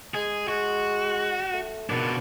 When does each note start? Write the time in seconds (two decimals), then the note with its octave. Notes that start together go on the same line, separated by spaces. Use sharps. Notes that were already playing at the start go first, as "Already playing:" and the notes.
0.14 G#3 G#4
0.48 G#3 F#4
1.54 A3
1.90 B2 D#3 D4